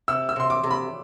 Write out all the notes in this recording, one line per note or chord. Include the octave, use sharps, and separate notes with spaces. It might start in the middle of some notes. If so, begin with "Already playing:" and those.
C3 E6
E6
C3 C6
D6
C3
B5